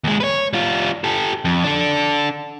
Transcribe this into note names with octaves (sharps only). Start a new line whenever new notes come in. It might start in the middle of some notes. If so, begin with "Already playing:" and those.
D#2 G#3
B4 C#5
G3 F4
G4 A4
F2
D4 A4